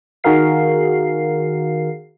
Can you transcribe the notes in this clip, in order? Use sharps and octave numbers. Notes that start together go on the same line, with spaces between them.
D#3 F#4 G#4 A#4 F5 C7